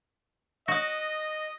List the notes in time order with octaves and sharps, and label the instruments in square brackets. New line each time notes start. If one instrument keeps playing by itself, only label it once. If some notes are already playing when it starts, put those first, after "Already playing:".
[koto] F#4 [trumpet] D#5 [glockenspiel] D#6 A#6